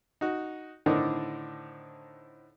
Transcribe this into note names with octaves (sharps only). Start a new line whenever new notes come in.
D#4 F#4
A2 D3 D#3 C4 D4 D#4